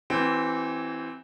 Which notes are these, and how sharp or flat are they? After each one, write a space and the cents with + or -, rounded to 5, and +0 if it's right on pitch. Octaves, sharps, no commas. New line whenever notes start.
E3 +0 C4 +0 G4 -45